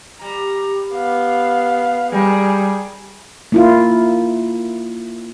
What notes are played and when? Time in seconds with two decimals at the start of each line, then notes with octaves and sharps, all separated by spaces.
0.21 G3 A#5
0.94 B3 F5
2.12 G3 G#4 A#4
3.52 A#3 E4 F4